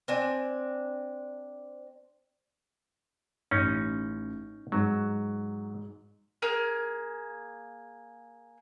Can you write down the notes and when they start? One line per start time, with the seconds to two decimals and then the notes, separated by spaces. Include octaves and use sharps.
0.08 C4 D4 G#5
3.51 A1 C#4 D#4
4.72 G#2 F#3
6.42 A#3 G#4 F6